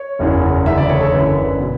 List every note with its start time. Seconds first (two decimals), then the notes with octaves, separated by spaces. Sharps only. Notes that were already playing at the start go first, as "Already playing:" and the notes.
Already playing: C#5
0.19 F#1 E2 C#3 E3
0.66 D2 C#3 E3 E5
0.77 D5
0.89 C#5
1.01 A4
1.13 F#1 F#2 D3 B4
1.60 B2